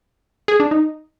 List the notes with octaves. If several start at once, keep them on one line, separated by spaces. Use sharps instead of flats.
G#4
D4
D#4